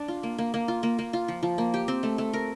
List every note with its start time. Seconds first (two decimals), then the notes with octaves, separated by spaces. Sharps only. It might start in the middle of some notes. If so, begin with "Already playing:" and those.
Already playing: D4
0.08 F4
0.23 A#3
0.38 A#3
0.54 A#3
0.68 F4
0.83 A#3
0.99 A#3
1.13 F4
1.28 F3
1.43 F3
1.58 A#3
1.74 G4
1.88 C4
2.03 A3
2.18 A3
2.33 A#4